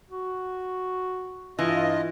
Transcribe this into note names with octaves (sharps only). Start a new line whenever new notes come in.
F#4
G2 E3 F4 D#5